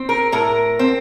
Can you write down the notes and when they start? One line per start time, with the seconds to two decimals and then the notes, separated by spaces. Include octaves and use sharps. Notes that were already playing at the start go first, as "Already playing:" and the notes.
Already playing: C4
0.09 A#4
0.32 A2 A#4
0.79 C4